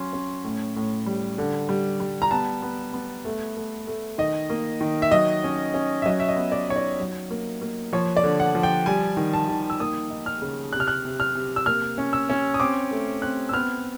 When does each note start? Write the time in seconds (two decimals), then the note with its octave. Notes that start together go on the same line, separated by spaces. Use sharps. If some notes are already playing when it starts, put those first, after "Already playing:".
Already playing: F#3 C#4 C6
0.13 C#4
0.44 A2
0.76 A2
1.06 G3
1.38 D3
1.69 G3
2.00 G3
2.22 A#5
2.31 B3 A5
2.62 B3
2.94 B3
3.25 A3
3.57 A3
3.87 A3
4.18 D#3 D#5
4.50 A#3
4.81 D#3
5.02 E5
5.11 F#3 D#5
5.44 C#4
5.74 C#4
6.02 E5
6.06 F#3 D#5
6.20 E5
6.29 D#5
6.36 B3
6.52 D5
6.68 D#4 C#5
6.76 D5
7.00 F#3
7.31 A#3
7.61 A#3
7.93 F3 C#5
8.17 D5
8.24 D3
8.40 F#5
8.55 F3
8.63 G5
8.86 G3 G#5
9.17 D#3
9.33 A5
9.49 D#3
9.70 E6
9.80 A#3 D#6
10.10 D#4
10.26 F6
10.42 C#3
10.73 C3 F#6
10.80 F6
10.88 F#6
11.05 C3
11.20 F6
11.35 C3
11.56 E6
11.66 A#3 F6
11.98 C#4
12.13 E6
12.30 C#4
12.54 D#6
12.60 C4 D6
12.91 A3
13.22 C4 F#6
13.49 E6
13.53 B3 F6